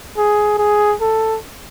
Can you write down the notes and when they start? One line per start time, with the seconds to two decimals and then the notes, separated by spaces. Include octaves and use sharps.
0.17 G#4
0.58 G#4
1.01 A4